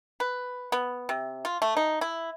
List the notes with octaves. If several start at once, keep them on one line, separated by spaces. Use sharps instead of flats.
B4
B3
C3
F4
A3
D#4
E4